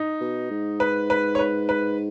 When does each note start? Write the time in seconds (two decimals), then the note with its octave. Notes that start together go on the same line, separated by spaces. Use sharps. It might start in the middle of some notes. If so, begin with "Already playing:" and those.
Already playing: D#4
0.21 B2
0.50 G#2
0.80 B4
1.10 B4
1.35 C#5
1.39 B4
1.69 B4